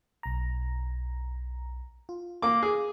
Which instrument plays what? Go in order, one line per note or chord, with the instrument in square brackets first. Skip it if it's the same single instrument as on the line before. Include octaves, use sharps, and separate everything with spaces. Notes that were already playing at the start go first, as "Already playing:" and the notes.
[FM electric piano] B1 A#5
F4
[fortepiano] A#3 D6
G#4